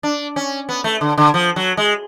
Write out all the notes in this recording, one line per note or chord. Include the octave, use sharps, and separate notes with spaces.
D4
C#4
B3
A3
D3
D3
F3
F#3
G#3